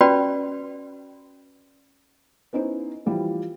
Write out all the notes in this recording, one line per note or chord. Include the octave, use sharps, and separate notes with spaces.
C#4 F#4 B4 D5 G5 B5
B3 C#4 D#4 E4 C5
E3 F3 G3